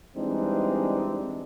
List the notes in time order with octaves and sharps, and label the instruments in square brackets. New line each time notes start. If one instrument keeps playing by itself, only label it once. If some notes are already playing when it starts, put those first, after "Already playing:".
[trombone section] E3 G3 G#3 C4 D4 D#4